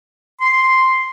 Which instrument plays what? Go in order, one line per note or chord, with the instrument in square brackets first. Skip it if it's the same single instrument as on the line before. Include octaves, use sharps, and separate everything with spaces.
[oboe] C6